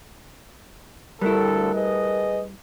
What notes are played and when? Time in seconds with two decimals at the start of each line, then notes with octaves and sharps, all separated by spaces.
1.21 D2 G3 A3 E4 A4 A#4 A5 F#6
1.74 G#4 B4 D#5